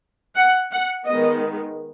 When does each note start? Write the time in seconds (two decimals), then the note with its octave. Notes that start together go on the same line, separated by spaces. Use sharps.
0.35 F#5
0.70 F#5
1.05 D#3 G#3 B3 D#5